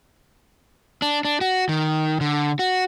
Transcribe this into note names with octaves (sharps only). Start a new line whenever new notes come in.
D4
D4
F#4
D#3
D3
F#4